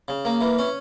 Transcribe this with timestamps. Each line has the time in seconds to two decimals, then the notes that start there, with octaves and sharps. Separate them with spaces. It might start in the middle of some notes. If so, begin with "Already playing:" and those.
0.08 C#3
0.25 A#3
0.41 E3
0.59 C#4